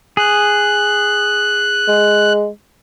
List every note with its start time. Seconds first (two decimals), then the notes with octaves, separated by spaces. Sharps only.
0.17 G#4 F#6
1.88 G#3